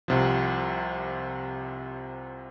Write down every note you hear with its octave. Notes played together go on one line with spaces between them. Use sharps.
C2 C3 F3